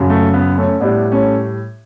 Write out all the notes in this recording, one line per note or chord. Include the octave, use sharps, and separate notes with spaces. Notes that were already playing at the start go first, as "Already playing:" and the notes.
Already playing: F#2 C#3 F#3
A3
B3
A3 C#4
A2 G3 B3 D4
A3 C#4